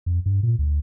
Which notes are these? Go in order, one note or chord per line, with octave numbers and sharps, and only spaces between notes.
F2
G2
A#2
D2